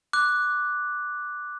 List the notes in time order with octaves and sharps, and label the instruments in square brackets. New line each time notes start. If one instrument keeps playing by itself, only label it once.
[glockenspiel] D6 F#6